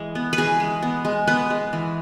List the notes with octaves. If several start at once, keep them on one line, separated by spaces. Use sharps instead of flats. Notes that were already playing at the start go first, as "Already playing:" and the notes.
Already playing: E3 G#3
B3
B4
E3 G#4
G#3
B3
G#3
B3 B4
G#3
E3